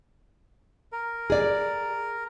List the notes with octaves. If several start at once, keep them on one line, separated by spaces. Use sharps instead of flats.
A#4
G#4 D5